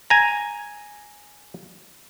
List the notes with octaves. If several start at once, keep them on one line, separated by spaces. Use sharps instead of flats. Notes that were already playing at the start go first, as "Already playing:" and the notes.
G#5 A#5